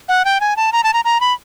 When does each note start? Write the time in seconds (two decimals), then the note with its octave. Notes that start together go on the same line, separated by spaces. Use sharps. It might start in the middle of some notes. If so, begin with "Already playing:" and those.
0.09 F#5
0.25 G5
0.41 G#5
0.57 A5
0.73 A#5
0.84 A5
0.94 A#5
1.05 A#5
1.21 B5